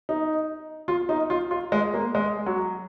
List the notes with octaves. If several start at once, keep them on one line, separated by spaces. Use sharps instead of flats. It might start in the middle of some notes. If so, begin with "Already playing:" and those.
D#4
F4
D#4
F4
F4
G#3
A#3
G#3
F#3